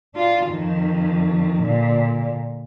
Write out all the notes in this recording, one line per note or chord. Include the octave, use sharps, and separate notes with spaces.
D4 F4
F2 D#3
A#2 D3